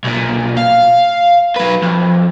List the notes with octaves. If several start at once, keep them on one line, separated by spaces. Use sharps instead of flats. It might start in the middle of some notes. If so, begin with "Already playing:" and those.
B1 A#2
F5
F#3 B4
F2